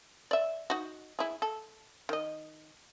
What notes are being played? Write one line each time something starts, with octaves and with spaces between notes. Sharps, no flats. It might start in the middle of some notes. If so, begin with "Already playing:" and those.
D5 E5
D#4 F#4
E4 G#4
A4
D#3 D#5